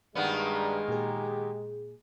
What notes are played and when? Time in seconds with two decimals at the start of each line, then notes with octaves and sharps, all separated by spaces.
0.15 G2 D#3 G#3 A#3 B3 D5 D#6
0.89 A#2 G4 G#4